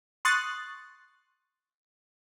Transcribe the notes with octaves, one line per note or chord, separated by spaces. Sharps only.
C6 C#6 D#6 F#6 A6